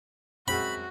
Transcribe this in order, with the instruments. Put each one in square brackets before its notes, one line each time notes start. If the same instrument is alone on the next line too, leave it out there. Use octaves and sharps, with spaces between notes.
[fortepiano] F#2 G#3 C4 [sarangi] F#4 [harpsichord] B5